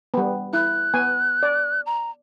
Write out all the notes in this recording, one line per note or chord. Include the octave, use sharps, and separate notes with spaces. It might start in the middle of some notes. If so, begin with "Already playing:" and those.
G3 B3
E4 F#6
B3 G#5
D5
A#5